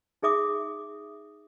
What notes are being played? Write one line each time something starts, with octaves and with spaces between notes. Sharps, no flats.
D#4 G#4 E5 D6 D#6